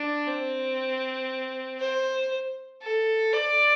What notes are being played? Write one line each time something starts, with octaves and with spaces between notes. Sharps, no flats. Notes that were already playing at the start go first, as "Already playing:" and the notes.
Already playing: D4
C4
C5
A4
D5